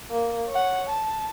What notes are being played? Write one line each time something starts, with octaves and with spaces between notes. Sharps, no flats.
A#3
C#5 F#5
A5